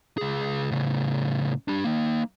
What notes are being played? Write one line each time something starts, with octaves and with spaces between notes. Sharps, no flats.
C#2 G#4
A2 C#3
D4 G4
A#3 D#4